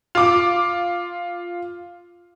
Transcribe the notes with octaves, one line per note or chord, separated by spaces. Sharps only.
F4 D6